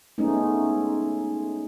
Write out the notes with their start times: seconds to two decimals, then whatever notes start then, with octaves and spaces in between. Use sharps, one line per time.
0.18 G#3 A3 B3 C#4 D#4